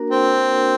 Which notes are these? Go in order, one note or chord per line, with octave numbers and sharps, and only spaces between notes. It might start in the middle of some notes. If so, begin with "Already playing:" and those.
Already playing: A#3 D4 F#4 A#4
C4